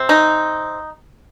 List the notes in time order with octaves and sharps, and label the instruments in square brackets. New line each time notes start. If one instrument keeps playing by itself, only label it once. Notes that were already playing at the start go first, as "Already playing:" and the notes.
Already playing: [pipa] C3 C4
D#4